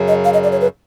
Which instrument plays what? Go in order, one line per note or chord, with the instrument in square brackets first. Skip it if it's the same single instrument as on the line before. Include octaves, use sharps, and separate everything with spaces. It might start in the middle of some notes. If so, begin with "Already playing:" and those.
Already playing: [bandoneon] F#2 C#3 F#3
[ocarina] D#5
F5
D#5
D5
C#5
B4